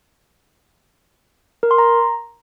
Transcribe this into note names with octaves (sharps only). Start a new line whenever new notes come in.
A#4
C6
A#5